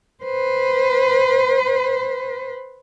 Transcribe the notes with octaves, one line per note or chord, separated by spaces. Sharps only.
B4 C5